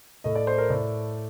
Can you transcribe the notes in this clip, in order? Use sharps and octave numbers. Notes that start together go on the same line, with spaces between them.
A2 A3 D#5
D5
C5
A#4
A2 A3 D5